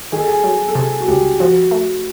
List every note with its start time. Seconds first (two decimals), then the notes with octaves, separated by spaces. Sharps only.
0.12 D#3 G#4
0.20 A4
0.27 G#4
0.44 F#3
0.68 A4
0.75 C3 G#4
1.00 F#4
1.08 C#2 G4
1.39 F3 F#4
1.71 A3